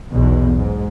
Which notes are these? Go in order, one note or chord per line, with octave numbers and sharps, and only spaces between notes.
B1 E2 B2
G#2